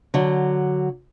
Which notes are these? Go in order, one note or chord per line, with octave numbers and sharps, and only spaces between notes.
D3 F#3